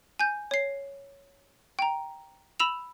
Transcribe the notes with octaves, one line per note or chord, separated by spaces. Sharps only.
G#5 G6
C#5 C7
G5 A#5
B5 E6 E7 F7